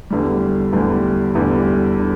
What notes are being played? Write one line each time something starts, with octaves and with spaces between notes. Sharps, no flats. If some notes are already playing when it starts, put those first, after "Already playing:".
E2 D3 G3
E2 D3 G3
E2 D3 G3
D3